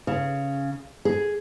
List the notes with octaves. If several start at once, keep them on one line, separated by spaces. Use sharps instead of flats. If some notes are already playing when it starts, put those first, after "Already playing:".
C#3
G#4